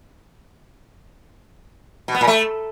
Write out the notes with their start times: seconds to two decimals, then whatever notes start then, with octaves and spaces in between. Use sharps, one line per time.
2.08 B2
2.15 B3
2.21 A#2
2.27 A3